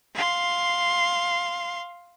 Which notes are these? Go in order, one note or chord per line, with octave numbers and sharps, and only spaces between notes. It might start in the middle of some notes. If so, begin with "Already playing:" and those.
F5 C6